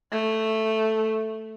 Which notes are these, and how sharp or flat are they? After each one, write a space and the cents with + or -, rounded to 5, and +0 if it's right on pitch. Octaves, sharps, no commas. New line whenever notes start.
A3 +0